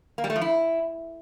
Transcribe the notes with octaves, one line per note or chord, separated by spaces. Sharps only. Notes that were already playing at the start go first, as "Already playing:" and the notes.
A#3
G3
A3
F3
E4